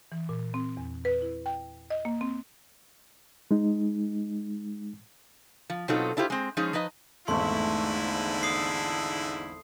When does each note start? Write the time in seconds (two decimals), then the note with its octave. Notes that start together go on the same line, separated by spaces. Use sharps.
0.12 E3
0.29 A#2
0.54 C4
0.77 E2
1.05 B4
1.22 E4
1.46 G5
1.90 D#5
2.05 A#3
2.21 C4
3.51 G#3 D#4
5.70 F3
5.88 B2 F#3 C4 D#4 F4 A4
6.17 D4 E4 F4 G4 C5
6.30 G#3 C4
6.57 F3 G#3 C#4 D#4 G#4
6.73 F3 D#4 B4 D#5
7.28 G#1 E2 G#2 D3 A3 E4 C6
8.43 D#6 C7